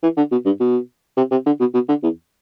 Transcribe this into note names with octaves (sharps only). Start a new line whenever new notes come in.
E3
D3
B2
G2
B2
C3
C3
D3
B2
B2
D3
E2